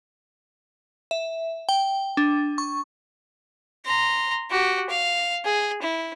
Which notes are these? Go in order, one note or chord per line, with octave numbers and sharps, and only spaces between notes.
E5
G5
D4
C#6
A#5 C6
F#4 G4
F5
G#4
E4